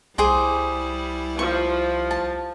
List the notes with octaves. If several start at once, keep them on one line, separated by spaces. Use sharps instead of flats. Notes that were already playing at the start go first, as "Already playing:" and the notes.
C2 G3 E4 G#4 C5 D6
F3 C#6
A5